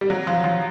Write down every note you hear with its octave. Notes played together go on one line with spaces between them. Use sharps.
G3
F#3
F3
F3